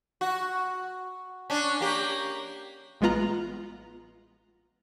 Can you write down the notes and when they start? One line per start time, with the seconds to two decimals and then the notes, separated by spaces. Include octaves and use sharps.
0.21 F#4
1.50 C#4 D4
1.81 A#3 G4
3.01 A1 G#3 B3 F4 A#5 F#6